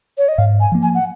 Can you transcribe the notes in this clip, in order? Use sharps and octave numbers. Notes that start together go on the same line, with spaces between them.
C#5
D#5
G#2 F5
G#5
F3 A#3
G#5
F#5